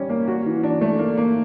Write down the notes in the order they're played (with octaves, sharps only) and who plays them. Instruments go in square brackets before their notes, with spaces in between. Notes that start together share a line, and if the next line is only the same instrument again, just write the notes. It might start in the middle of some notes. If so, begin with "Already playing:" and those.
Already playing: [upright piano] G3 C#4
A#3
F#4
E3
D4
A3
A#3
A#3